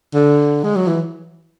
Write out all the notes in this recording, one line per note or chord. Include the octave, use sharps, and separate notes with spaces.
D3
G#3
F#3
E3